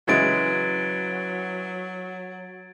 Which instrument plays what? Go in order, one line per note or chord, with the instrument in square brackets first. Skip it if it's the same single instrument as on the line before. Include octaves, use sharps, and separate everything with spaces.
[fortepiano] C#3 E3 G#3 [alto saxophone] F#3 [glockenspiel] G#6 A6 D7